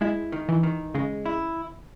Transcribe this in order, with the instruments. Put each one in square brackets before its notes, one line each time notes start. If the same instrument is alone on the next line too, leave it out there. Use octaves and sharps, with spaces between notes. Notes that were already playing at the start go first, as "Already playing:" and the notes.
[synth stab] G#3 [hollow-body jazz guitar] E4
[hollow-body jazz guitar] D#3
[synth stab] E3
[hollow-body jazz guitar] D#3
[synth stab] C#3 [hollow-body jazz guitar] G#3
[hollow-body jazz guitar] E4